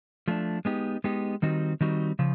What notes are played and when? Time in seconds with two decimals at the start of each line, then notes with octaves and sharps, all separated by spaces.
0.28 F3 A3 D4
0.65 G#3 B3 D#4 G4
1.04 G#3 B3 D#4 G4
1.42 D#3 G3 C4 D#4 F#4
1.81 D#3 G3 C4 D#4 F#4
2.19 C#3 F3